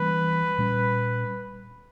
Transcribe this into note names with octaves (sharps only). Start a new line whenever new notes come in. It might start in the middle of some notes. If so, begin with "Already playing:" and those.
Already playing: E3 G3 A#3 C#4 B4
A#2 G3 C#4